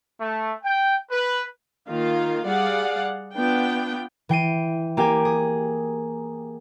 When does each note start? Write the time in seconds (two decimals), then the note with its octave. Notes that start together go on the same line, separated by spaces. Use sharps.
0.19 A3
0.63 G5
1.10 B4
1.88 D#3 A#3 F4 F5
2.46 G3 G#4 D5 F5 F#5
3.35 B3 D4 F4 G5
4.29 E3 G5 C7 D#7
4.97 A#3 G4 A#4 G5 G#5
5.25 G#4